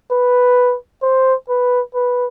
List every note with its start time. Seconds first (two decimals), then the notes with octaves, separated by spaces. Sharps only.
0.11 B4
1.02 C5
1.49 B4
1.94 B4